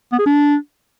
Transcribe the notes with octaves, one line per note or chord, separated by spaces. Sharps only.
B3
G#4
D4